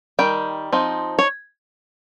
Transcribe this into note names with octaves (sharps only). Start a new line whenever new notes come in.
D#3 G3 G5
F3 C4 D#4
C#5